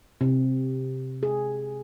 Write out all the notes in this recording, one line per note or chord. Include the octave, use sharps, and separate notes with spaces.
C3
G#4